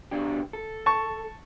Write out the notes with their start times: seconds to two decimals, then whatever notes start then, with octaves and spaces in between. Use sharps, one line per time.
0.11 B2 D4 G4
0.53 A4
0.86 A5 C#6